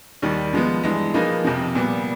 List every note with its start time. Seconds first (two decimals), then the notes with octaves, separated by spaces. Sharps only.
0.22 D#2 D#3 G3
0.54 F3 G#3 B3
0.83 G2 E3 G#3
1.14 F3 A#3 D#4 G#4 B4
1.44 F2 C3 F3
1.75 A#2 G3 B3